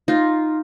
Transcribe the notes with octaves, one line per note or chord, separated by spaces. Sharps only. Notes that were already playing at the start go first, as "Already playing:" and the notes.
D#4 F4